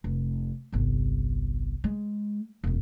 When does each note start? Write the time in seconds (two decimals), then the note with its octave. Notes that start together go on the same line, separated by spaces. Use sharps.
0.04 F1
0.72 G1 C2
1.84 G#3
2.64 E1 F#2